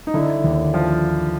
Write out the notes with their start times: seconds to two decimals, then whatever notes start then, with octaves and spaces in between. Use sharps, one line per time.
0.07 D#4
0.14 D3 E4
0.44 D#2
0.74 F3